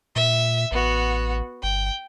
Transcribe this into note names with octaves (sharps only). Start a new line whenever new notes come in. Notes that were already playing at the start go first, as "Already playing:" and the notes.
A#2 E5
A1 B3 F#4
G1 G5